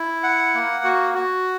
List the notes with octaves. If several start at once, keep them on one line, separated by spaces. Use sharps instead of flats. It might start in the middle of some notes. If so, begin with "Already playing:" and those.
Already playing: E4
F#5
A#3
F#4
F#4